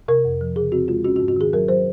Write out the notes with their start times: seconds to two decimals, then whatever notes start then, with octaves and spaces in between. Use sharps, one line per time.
0.08 C3 A#4
0.25 F2
0.41 F3
0.56 C#3 G#4
0.72 C4 F#4
0.88 G#3 F4
1.04 C#4 F#4
1.16 F#4
1.20 G#2
1.28 F#4
1.36 D#3 G#4
1.53 F#3 A#4
1.68 F#3 C5